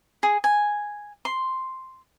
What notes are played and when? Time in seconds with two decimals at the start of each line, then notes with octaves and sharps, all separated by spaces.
0.23 G#4
0.44 G#5
1.25 C6